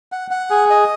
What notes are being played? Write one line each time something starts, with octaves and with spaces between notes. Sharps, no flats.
F#5
F#5
G#4
D#5